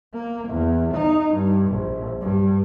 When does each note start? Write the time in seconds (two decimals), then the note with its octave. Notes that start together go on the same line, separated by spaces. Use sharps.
0.14 A#3
0.49 E2
0.95 D#4
1.34 G2
1.71 A#1
2.21 G2